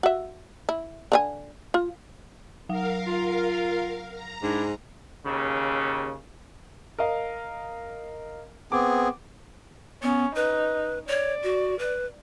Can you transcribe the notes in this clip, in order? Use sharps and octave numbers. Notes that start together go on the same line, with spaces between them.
F#4 E5
E4
D3 F4 G#5
F4
F#3 A#4 F5 F#5
F4
A#5
G#2 D4 E4
D#2 C#3
A#4 D#5 F5
B3 C4 G#4 D6
B3 C#4
D#4 B4
C#5 D5
F#4
B4